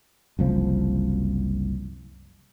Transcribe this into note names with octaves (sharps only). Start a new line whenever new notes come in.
F#1 C2 F3